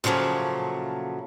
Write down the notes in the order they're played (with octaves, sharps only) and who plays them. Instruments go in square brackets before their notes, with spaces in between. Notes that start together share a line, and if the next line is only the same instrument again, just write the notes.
[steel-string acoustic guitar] A#2 C#3 F3 F#3 A3